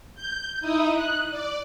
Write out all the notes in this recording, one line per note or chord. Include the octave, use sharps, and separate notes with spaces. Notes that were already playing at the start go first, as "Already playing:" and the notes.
G6
D#4 E4 D#6
F#6
D5